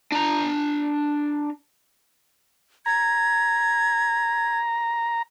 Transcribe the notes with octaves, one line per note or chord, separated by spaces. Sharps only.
D4 A#5
A#5 G#6